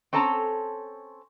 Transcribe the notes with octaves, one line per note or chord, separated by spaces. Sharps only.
C4 C#4 A4 A5 A#5